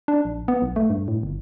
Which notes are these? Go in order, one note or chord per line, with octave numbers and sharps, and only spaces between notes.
D4
A#1
B3
B1
A3
G2
A2
G1